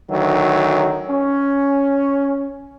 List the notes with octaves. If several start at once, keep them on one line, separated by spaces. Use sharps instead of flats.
D2 D#3 F#3
C#4